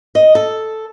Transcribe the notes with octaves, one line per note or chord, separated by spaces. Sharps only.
D#5
A4